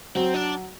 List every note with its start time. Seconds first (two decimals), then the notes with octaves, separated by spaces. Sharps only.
0.15 F#3 C4
0.34 D4